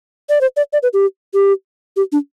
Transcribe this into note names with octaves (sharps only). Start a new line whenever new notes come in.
D5
C5
D5
D5
B4
G4
G4
G4
D4